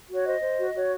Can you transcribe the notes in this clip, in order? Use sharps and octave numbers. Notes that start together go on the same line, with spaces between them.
F#4 C#5
C5 D#5
C5
F#4
F#4 C#5